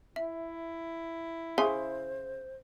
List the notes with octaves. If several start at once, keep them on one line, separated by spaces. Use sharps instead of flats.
E4 E5
C#3 C5 E5 G#5 C6